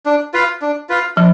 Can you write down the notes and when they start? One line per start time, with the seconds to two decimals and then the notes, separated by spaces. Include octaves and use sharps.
0.06 D4
0.33 F4 B4 F5
0.61 D4
0.89 F4 B4 F5
1.17 F3 D4